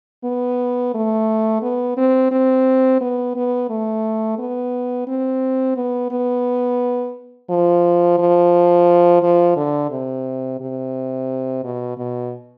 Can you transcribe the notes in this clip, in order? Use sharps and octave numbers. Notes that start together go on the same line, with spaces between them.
B3
A3
B3
C4
C4
B3
B3
A3
B3
C4
B3
B3
F3
F3
F3
D3
C3
C3
B2
B2